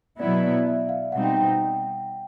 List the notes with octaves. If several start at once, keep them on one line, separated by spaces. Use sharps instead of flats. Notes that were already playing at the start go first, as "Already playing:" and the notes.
B2 F#3 B3 E4 D5
D5
E5
F5
B2 G3 C4 D#4 F#5
G5
G5